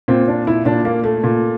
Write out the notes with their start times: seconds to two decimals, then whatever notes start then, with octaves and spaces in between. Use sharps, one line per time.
0.08 A#2 C4
0.28 D4
0.47 E4
0.65 A#2 D4
0.85 A#3
1.04 A3
1.24 A#2